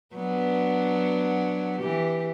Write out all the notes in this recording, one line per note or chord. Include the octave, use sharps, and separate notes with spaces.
F#3 B3 D4
E3 G4